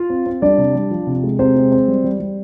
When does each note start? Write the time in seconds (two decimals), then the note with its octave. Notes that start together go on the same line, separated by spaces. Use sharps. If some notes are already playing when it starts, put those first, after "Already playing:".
Already playing: F4 F5
0.10 C4
0.26 C4
0.42 G3 D4 D5
0.58 C3
0.75 G3
0.91 F3
1.07 C3
1.24 G#3
1.39 C3 C4 C5
1.56 G#3
1.72 C4
1.88 G3
2.04 G3
2.20 G3